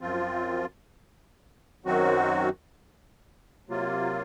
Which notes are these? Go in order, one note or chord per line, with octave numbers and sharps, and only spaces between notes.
F#2 F3 C4 F4
F#2 D#3 F#3 C4 F#4
C3 F#3 A#3 F4